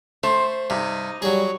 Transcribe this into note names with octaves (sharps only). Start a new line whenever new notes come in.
A3 C5
G2 C3 D#4
F#3 G3 G#4 C#5